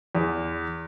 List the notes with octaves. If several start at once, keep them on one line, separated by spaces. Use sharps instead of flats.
E2